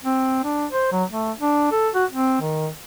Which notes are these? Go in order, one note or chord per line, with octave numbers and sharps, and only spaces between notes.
C4
D4
C5
F#3
A3
D4
A4
F#4
C4
D#3